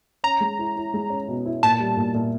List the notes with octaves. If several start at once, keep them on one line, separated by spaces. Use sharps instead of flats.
C#4 A#5
G#3
E4
E4
G#3
C#4
B2
E4
A#2 A5
G3
A#2
A#2